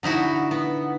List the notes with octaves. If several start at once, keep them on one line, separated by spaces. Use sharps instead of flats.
D3 D#4 E4 F#4
B3